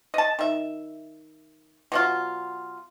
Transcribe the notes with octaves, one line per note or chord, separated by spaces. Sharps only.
D#5 A5
D#3 E5
B2 F#3 F4